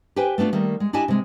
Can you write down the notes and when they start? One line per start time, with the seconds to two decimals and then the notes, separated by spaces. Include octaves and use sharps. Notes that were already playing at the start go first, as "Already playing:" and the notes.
0.16 G4 B4 C5 G5 G#5
0.38 A3 B3 D4 F4
0.53 D#3 G3 A3 A#3
0.80 G#3
0.93 D4 E4 G4 D#5 G#5 A5
1.08 C3 G#3